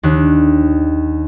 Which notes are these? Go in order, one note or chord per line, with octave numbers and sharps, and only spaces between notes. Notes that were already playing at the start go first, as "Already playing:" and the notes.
D#2 D4